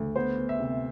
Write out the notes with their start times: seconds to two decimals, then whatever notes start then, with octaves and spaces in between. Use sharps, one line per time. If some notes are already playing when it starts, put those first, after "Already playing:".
Already playing: D2
0.16 B3 C5
0.38 B3
0.49 E5
0.60 C3